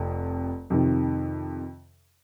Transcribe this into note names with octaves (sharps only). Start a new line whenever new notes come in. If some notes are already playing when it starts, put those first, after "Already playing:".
Already playing: F1 F2
F2 C3 D#3